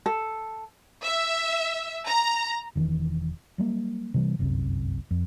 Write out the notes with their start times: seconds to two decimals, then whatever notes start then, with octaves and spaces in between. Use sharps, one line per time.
0.06 A4
1.04 E5
2.09 A#5
2.75 E1 D#3 E3
3.58 F#3 G3 A#3
4.14 C3 E3 G3
4.39 G1 C2 F#2 C3
5.11 F2